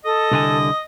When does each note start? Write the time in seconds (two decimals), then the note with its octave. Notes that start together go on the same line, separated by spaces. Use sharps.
0.05 A4 D#5
0.31 C2 D3 G#5